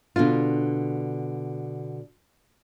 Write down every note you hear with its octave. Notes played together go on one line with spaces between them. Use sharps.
B2 D3 D4 F4